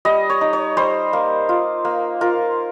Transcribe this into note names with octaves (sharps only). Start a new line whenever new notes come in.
G3 D#5
C#5
D#4
C#5
G3 C5
A#3
F4
A#3
F4 A#4